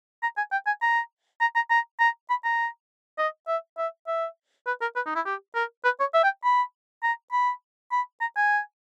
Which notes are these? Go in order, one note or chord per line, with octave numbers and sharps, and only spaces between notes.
A#5
G#5
G5
G#5
A#5
A#5
A#5
A#5
A#5
B5
A#5
D#5
E5
E5
E5
B4
A#4
B4
D#4
E4
G4
A#4
B4
C#5
E5
G5
B5
A#5
B5
B5
A#5
G#5